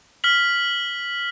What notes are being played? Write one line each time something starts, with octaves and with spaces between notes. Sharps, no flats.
F6 B6 F#7